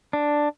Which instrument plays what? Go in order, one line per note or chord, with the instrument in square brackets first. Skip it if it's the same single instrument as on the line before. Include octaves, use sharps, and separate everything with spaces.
[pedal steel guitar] D4